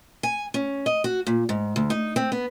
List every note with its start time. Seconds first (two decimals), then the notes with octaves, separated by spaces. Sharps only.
0.23 G#5
0.54 C#4
0.86 D#5
1.04 F#4
1.27 A#2
1.49 G#2
1.76 D2
1.90 D#4
2.16 C4
2.32 B3